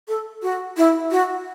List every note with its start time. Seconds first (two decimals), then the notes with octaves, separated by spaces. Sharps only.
0.08 A4
0.42 F#4
0.77 E4
1.11 F#4